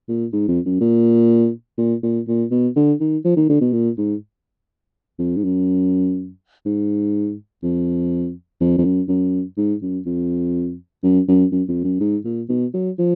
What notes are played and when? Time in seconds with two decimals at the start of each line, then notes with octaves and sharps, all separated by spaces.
0.09 A#2
0.33 G#2
0.48 F2
0.65 F#2
0.81 A#2
1.78 A#2
2.03 A#2
2.28 A#2
2.51 B2
2.76 D3
3.00 D#3
3.25 F3
3.36 D#3
3.49 D3
3.61 B2
3.73 A#2
3.98 G#2
5.19 F2
5.36 G#2
5.44 F#2
6.65 G#2
7.63 F2
8.61 F2
8.78 F2
8.85 F#2
9.08 F#2
9.57 G#2
9.82 F#2
10.06 F2
11.03 F#2
11.28 F#2
11.51 F#2
11.68 F2
11.84 F#2
12.00 G#2
12.25 A#2
12.49 B2
12.74 F#3
12.99 F3